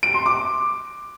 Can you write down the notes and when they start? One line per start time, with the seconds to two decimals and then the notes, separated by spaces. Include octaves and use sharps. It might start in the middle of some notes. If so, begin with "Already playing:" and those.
0.03 D7
0.14 C6
0.26 D6